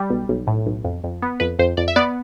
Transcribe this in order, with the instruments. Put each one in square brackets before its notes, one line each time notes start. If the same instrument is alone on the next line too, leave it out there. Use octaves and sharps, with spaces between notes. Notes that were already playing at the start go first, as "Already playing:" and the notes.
Already playing: [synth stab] G3
B1
B1
A2
B1
F2
F2
B3
F2 B4
F2 C5
F2 D5
E5
B3 D5